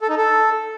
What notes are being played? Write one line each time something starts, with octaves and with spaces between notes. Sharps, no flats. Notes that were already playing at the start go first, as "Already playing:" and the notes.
A4
D#4
A4